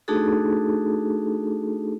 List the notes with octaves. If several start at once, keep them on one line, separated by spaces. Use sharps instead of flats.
A3 D4 D#4 F#4 G#4 A4